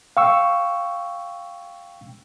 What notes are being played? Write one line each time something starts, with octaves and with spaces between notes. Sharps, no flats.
F5 G5 C#6 E6